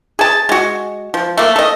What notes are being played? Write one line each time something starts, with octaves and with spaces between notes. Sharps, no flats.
G#4 A5
G#3 F#4
F3
A3 A#3
A4 D#5